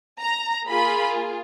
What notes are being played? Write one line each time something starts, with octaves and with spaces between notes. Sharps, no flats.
A#5
A#3 F4 G#4 B5